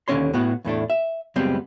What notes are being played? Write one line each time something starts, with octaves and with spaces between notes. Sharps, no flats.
D#2 D3 G#3 C#4 C#5 C6
A2 B3 F#4
E2 A2 A3 D4
E5
C#2 F#2 G3 G#3 B3 C4